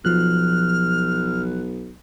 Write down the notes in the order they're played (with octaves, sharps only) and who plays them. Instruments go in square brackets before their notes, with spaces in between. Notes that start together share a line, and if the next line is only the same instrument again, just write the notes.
[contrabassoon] B1 [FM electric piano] F3 F#6 [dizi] F6